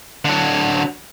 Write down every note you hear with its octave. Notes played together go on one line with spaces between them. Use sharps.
D3 F#3